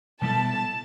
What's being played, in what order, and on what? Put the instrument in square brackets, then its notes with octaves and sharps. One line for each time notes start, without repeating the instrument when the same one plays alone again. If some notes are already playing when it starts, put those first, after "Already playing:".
[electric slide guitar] B2 G3 B3 E4 A4 [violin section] A5